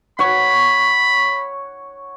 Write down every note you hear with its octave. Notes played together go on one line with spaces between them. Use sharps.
C#5 F#5 B5